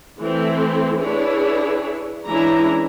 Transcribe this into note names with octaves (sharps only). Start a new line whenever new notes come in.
E3 A3 C4 E4
D4 E4 G#4 B4 C#5
E3 G#3 C#4 D4 E4 A#5